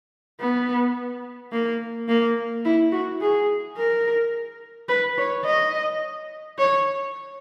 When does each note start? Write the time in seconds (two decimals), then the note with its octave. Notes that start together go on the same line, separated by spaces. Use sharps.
0.40 B3
1.52 A#3
2.08 A#3
2.65 E4
2.92 F#4
3.21 G#4
3.77 A#4
4.89 B4
5.17 C#5
5.45 D#5
6.59 C#5